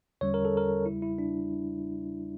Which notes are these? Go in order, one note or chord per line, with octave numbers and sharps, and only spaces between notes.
E2 D3 G3 C#4 C#5
A#4
A4
A#4
E2 C#3 G3 E4
E4
D4